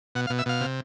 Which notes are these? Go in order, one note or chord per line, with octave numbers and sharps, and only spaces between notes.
B2 F#5
F5
B2
E5
B2 F5
C3